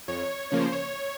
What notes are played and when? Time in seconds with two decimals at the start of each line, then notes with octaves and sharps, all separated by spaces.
0.08 F2 C#5
0.51 C#3 F3 A#3 C#5
0.61 C5
0.72 C#5